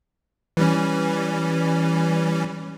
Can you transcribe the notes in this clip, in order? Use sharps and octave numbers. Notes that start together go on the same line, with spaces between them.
E3 G3 C#4